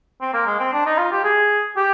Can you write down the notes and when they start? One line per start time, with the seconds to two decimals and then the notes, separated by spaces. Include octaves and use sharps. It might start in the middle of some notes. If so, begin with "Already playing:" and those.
0.21 C4
0.34 A#3
0.46 G#3
0.59 C4
0.73 D4
0.86 D#4
0.98 F4
1.12 G4
1.24 G#4
1.76 G4